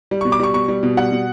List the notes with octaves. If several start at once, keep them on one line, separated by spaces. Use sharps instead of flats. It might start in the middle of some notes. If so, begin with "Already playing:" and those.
G3
B2 C#6
D6
G3 C#6
B2 C#6
G3
B2
G3 F#5
B2